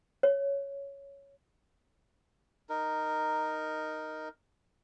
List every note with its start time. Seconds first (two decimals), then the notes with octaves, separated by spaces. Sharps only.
0.23 C#5
2.69 D#4 A#4